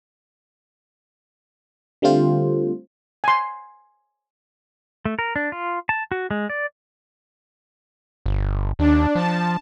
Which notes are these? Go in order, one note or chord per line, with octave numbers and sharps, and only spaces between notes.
D3 G3 A3 C4 F4 C5
G#5 C6
A3
A#4
D4
F4
A5
F#4
G#3
D5
G1
D#2 D4
F3 A5